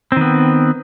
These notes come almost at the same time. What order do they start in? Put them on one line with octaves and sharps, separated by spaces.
C4 D#3 B3